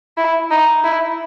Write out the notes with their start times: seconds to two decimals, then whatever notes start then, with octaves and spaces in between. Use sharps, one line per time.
0.17 E4
0.50 D#4
0.84 E4